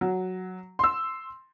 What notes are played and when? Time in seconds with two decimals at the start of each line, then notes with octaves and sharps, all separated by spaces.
0.01 F#3
0.79 C6 E6